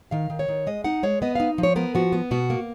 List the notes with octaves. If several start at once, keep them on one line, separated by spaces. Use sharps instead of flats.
D#3 F5
D#3
C#5
D#3
G#3 D#5
D#4 F#5
G#3 C#5
B3 D#5
D#4 F5
F3
C#5
B3 A#4
F3 F#4
B3
B2 F#4
A#3